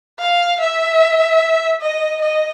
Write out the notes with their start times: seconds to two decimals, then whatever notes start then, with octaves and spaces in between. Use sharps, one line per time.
0.20 F5
0.61 E5
1.81 D#5
2.22 D#5